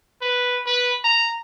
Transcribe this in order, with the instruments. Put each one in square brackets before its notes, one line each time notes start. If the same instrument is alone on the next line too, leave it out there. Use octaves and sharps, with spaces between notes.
[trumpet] B4
B4
A#5